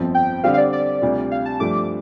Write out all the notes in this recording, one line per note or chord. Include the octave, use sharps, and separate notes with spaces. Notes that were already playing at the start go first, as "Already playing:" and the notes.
Already playing: G1 F2 F3 C4
G5
D3 G3 C4 G4 F5
F5
D5
D5
D2 C3 G3 F4
F5
A5
G2 F3 A3 D4 D6